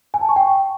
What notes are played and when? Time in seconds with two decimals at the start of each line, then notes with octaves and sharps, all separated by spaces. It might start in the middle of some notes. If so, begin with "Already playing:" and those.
0.14 G#5
0.21 A5
0.29 C#6
0.36 G5